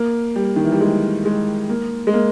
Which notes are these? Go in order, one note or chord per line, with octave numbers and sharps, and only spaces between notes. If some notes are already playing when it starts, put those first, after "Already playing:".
Already playing: A#3
G3
D#3
E3
G3
G#3
G#3
A#3
G#3
A#3